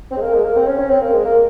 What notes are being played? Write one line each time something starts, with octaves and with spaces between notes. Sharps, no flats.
C4
G#3
A#3
G#3
A#3
C4
C#4
C#4
C4
A#3
G#3
A#3